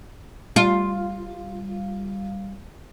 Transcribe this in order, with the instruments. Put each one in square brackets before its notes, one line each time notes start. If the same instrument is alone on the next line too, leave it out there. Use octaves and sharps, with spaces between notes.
[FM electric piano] G3 F5 [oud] F4